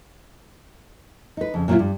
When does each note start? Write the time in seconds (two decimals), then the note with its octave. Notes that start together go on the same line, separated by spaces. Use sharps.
1.37 D#4 B4
1.54 F2 C#3
1.68 A#2 F#3 A#3 E4 F4
1.79 G2